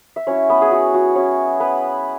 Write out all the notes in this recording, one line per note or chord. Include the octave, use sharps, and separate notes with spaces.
E5
F#3 C#4 E4 C#5
B3 B4
G#4
F#4
F#4
F#3 C#4 E4 C#5
B3 B4